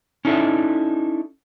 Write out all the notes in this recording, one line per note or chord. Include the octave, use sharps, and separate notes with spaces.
C#4 D#4 E4 A4 D5 E5